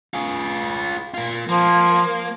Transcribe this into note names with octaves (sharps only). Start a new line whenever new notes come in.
F4 G#4
A#3 F4
F3 A#3